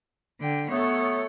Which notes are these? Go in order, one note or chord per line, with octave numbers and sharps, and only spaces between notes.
D3 G5
F#3 A3 B3 A4 C#5